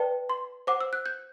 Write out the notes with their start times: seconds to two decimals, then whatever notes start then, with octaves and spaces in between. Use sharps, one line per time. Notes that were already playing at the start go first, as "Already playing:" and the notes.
Already playing: B4 D5 G5 A5
0.29 C6
0.67 C5 F#5 D6
0.81 E6
0.93 F#6
1.06 G6